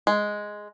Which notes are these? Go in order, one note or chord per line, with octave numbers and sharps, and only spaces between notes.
G#3